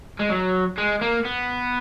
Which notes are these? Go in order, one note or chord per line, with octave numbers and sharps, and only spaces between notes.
G#3
F#3
G#3
A#3
B3